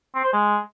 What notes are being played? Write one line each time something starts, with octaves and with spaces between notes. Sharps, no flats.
C4
C5
G#3